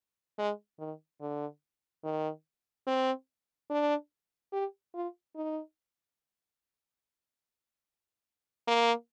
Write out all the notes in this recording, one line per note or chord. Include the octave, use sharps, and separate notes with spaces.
G#3
D#3
D3
D#3
C4
D4
G4
F4
D#4
A#3